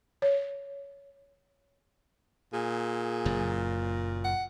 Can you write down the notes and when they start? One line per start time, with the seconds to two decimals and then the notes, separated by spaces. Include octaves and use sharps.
0.22 C#5
2.53 A#2 G#4
3.26 F#1 F#2
4.25 F#5